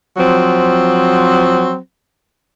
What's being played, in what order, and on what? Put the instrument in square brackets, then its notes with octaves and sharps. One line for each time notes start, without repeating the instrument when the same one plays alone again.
[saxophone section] F3 F#3 C4